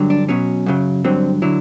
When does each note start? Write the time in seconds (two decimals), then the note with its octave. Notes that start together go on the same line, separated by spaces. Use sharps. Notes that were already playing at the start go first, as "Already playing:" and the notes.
Already playing: G2 D3 F#3
0.10 D4
0.29 B2 F#3 C#4
0.66 F#2 C#3 F#3
1.05 G2 D3 F#3 C4
1.42 D3 F#3 E4